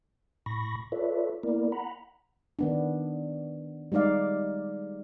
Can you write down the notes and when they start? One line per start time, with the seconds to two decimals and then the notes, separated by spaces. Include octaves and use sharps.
0.46 A2 B5 C#6 A#6
0.92 F4 A4 B4 C#5 D5 E5
1.43 A#3 B3 E4 A#4 D5
1.72 F#5 A#5 B5
2.59 D#3 B3 D4
3.92 G3 G#3 D#4 D5 F5